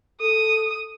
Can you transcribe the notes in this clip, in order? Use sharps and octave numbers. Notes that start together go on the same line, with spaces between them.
A4 D#6